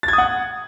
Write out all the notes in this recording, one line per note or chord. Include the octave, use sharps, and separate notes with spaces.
A6
G#6
D#6
F#5